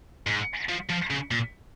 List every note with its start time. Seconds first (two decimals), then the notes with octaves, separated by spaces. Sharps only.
0.27 G#2
0.69 F3
0.89 F3
1.10 C#3
1.31 A#2